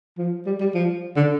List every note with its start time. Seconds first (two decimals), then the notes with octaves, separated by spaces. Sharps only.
0.18 F3
0.46 G3
0.61 G3
0.75 F3
1.17 D3